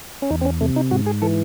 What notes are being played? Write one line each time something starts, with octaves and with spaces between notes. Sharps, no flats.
C#4
E2 D#4
C4
C#4
C3 A3
D#4
G#2 F#4
G#4
E3 A4